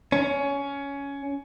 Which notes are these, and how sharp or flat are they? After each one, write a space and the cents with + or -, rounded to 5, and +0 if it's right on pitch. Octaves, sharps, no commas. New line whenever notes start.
C#4 +15